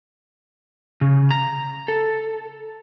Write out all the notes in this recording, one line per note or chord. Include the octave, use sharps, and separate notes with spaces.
C#3
A#5
A4